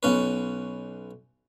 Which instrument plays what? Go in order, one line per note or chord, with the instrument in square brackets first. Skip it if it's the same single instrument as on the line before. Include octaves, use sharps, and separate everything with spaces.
[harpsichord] B1 C#4 B4